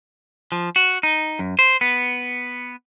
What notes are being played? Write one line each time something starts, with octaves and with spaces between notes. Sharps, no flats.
F3
F#4
D#4
F#2
C5
B3